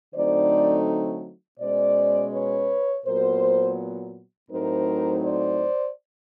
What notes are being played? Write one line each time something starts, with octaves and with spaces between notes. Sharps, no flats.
D3 F#3 A3 C4 D#4 C5 D5
B2 G#3 C#4 C5 D5
B4 C#5
A#2 F#3 B3 A#4 C5
A2 F#3 A3 C4 D#4 A#4 C5
C5 D5